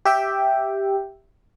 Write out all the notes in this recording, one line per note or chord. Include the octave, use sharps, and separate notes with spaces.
G4 E5 G5